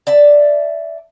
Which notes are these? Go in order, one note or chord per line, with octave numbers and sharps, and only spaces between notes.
D5 E5 A5